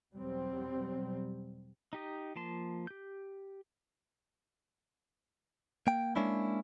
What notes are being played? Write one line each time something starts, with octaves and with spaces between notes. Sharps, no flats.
E2 B2 F#3 G3 C4
D#4 G4 D#5
F3 A#3 A5 C6
G4 G6
A#3 G5
G#3 A#3 C#4 D4 E4